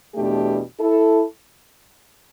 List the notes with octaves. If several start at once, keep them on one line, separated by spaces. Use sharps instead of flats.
E2 B2 A3 D4 G4
E4 A4